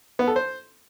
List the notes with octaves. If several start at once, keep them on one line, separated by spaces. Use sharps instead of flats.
B3
A4
C5